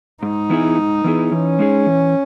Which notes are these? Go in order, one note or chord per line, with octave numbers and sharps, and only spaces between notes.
G#2 D#4
E3 B3 E4 G#4
G#2
E3 B3 E4 G#4
E3 C#4
G#3 D#4 G#4
E3